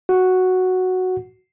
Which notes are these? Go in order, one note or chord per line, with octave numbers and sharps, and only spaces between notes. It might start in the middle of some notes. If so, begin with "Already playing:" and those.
F#4